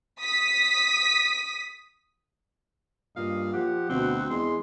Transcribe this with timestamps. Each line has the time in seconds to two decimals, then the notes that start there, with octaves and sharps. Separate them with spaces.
0.22 D#6 B6
3.16 G2 A#2 D#5 F5
3.54 F3 G4 F#5
3.90 D2 B2 C4
4.30 E2 G#3 C6